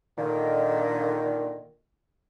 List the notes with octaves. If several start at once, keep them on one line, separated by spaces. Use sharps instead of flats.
A#2 D3 D#3